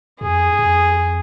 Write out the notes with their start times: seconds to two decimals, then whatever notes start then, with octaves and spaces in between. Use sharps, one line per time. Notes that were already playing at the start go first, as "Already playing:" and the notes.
0.21 F2 G#4
0.50 G2
0.59 F2